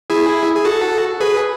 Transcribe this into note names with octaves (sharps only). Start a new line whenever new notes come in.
E4 G#4
G#4
F#4 A4
G#4 B4